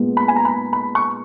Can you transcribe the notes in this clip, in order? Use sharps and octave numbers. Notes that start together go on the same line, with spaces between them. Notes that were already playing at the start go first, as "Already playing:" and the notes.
Already playing: A#2 G#3 B3
B5
G#5
A#5
B5
B5
C#6